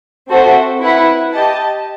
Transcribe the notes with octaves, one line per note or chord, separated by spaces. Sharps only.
C4 F#4 A4 C5 E5
E4 B4 F#5
G4 D#5 A5